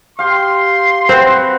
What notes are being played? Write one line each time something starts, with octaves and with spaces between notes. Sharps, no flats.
G4 F5 C6
C4 F#4 B4 C5